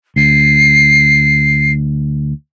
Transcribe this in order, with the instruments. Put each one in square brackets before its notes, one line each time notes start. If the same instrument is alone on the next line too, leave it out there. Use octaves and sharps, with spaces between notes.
[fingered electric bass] D2 [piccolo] C7